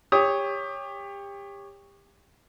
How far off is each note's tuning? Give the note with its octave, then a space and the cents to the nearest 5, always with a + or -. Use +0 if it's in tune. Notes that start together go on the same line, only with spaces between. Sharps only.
G4 +30 C#5 +0 D#6 +20